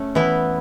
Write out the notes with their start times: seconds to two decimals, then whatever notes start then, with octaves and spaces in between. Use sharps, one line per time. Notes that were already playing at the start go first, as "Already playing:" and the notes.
Already playing: A3 C#4
0.15 E3 B3 E4